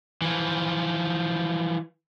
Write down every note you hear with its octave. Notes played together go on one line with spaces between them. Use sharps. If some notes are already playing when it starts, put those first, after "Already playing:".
E3 F3